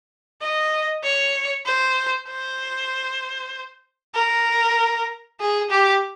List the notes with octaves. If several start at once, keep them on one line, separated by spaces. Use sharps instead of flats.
D#5
C#5
C5
C5
A#4
G#4
G4